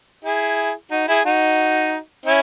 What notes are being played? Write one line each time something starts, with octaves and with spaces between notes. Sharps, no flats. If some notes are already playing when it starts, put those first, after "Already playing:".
E4 G#4
D#4 F#4
E4 G#4
D#4 F#4
C#4 E4